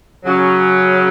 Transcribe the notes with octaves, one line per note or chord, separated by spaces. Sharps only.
C#3 F#3 C#4